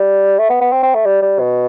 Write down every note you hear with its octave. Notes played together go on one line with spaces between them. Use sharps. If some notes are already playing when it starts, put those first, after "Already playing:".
Already playing: G3
A3
B3
B3
C4
C4
A3
G3
G3
B2